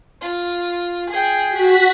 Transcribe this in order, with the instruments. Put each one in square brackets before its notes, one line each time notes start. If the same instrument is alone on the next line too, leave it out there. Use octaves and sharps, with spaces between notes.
[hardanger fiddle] F4
G#4 G5
[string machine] F#4 B6